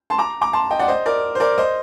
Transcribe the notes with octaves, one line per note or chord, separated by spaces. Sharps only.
A5 C6
A#5 D6
A#5 D6
A5 C6
D#5 G5
D5 F#5
C5 D#5
A#4 D5
C5
A#4 D5
C5 D#5